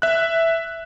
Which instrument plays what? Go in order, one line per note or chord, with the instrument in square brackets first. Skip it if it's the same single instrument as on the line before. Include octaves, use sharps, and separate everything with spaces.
[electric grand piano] E5 F#6